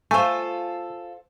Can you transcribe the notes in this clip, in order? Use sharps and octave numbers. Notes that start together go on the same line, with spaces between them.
A3 F4 A4 C5 G#5